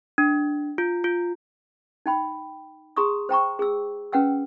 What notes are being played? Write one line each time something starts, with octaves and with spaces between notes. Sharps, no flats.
D4
F4
F4
D#4 G5 B5
G#4 A#5 C6 C#6 D#6
C5 G5 A#5 C#6
G#4 E6
C#4 B4 F#5 G5 E6